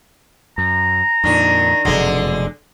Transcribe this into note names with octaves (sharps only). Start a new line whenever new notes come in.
F#2 A#5
F2 A#2 D#3 D4
F1 F#2 B2 D3 G#3